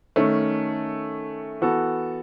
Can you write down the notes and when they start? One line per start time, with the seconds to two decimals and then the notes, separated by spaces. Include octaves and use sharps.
0.16 D#3 A3 C#4
1.61 E3 B3 F#4 A4